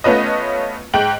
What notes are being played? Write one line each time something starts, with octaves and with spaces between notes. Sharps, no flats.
A3 B3 C#4 F4 B4 D#5
G#2 G5 F#7